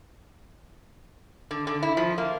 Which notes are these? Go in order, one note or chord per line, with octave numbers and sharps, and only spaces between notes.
D3
D3
E4
F3
A#3